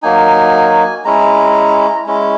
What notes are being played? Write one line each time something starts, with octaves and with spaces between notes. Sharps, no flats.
F#3 A#3 D#4 G#5
G#3 C#4 E4 A#5
G#3 C#4 E4